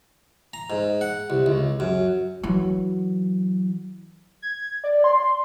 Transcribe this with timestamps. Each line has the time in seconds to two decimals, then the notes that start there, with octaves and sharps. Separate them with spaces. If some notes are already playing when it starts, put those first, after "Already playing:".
0.53 A#5
0.70 G#2
1.01 F#5
1.30 C2
1.46 C#2
1.80 F#2
2.44 E3 F#3
4.42 G#6
4.84 D5
5.04 C6